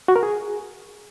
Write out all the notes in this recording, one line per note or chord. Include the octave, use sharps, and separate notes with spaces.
F#4
A#4
G#4